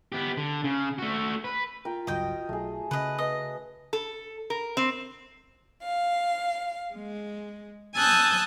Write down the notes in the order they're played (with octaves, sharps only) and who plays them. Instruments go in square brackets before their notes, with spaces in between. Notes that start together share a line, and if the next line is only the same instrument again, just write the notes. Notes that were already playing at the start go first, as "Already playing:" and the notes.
[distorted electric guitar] B3 G4
D3
C#3
A3 F#4
B4
[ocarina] F4 [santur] A#4 G5
[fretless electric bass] G1 C#2 F#3 [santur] F#4 D#6 [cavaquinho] D#5 G5
[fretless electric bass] B1 [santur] A3 G#4
[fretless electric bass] C#3 [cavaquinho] B4 D#5
[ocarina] B4 [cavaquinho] D#5
[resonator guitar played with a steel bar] A4
A#4
C4
[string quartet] F5
G#3
G#5 A5 D#6 E6 F#6 G6